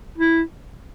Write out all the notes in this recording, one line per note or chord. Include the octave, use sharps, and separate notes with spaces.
E4